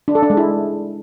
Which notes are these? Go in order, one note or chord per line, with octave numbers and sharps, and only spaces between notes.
D4
A4
D4
G#3
E4